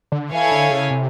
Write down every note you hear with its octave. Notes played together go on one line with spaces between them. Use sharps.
D3
E3 E4 A4 C#5 F5 G#5
D3
C#3
C3